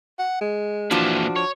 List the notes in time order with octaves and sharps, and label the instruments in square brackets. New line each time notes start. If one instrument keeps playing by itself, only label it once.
[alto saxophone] F#5
G#3
[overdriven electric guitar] A#2 E3 [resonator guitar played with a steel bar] F3 D4 [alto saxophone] F#4
[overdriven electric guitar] C#5